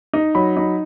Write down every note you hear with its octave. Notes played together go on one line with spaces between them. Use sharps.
D#4
F#3 B5
D#4